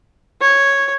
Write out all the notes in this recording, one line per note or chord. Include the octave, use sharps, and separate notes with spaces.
C#5